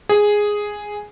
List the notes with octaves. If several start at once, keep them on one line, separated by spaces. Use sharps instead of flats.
G#4